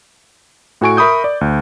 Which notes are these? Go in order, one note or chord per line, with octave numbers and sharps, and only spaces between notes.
A2 F#4 A4 G#5 C#6 D7
A#4 E5 B5 C#6 D#6 G6
D5
D2